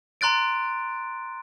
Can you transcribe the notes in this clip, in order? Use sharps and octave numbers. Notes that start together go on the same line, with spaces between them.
A#5 C6 F#6 A6 D7